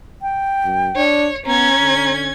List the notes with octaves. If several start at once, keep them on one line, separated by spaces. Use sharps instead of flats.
G5
F#2
D4 C#5
B3 C#4 A#5 G#6
D3